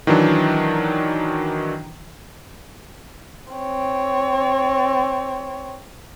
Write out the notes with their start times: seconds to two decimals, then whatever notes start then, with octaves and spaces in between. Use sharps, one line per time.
0.07 D#3 E3 F#3 D4
3.53 C4 C#5